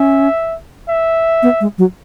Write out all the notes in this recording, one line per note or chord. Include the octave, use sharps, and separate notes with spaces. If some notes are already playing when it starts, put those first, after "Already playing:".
Already playing: C#4 E5
E5
B3
G#3
F#3